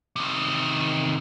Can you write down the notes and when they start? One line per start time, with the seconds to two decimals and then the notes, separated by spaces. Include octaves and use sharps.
0.16 C3 D#3